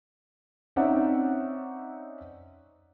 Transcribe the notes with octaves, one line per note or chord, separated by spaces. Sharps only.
C4 C#4 D#4 D5 E5 F#5